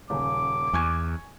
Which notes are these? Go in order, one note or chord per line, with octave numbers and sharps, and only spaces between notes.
D#1 C#3 D6
E2 G#5 C#6 G#6